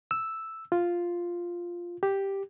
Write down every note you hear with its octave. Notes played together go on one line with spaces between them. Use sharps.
E6
F4
G4